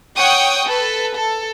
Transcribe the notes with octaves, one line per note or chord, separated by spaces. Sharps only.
C#5 F#5 G5 C#6 D#6
A4 B4
A4